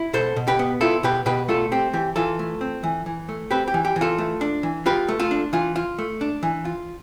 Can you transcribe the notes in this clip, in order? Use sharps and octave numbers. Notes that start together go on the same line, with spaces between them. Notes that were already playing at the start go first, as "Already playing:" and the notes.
Already playing: E4
B2 A4 C5
B2
G4 B4
B3
E4 F4 A4
B2 G4 B4
B2 G4 B4
A3 F4 A4
C4 G4
E3 G4
E3 F4 A4
A3
C4
E3
E3
A3
C4 G4 B4
G4
E3
G4
E3
F4 A4
A3
D4
E3
F4 G4 B4
A3
F4 A4
D4
E3 F4
F4
A3
D4
E3
F4